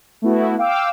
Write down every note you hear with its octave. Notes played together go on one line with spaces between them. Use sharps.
A3 B3 E4 F#4
F5 G5 D6 E6